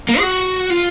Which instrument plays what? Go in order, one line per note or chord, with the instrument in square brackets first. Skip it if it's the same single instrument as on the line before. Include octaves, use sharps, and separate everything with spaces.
[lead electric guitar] A#3
G#4
F#4
F4